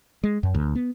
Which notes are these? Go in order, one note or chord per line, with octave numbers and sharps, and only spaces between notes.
G#3
F#2
D2
B3